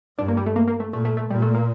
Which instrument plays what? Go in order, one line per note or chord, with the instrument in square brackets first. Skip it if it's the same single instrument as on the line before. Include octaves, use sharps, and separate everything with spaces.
[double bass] G2 [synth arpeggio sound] D4
[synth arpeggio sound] A#3
G3
A3
A#3
A#3
A3
[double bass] A#2 [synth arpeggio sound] A3
[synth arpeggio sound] A3
A3
[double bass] A#2 [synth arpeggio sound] G3
[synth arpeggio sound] A3
A#3